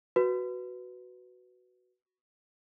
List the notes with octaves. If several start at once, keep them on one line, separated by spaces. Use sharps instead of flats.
F#4 B4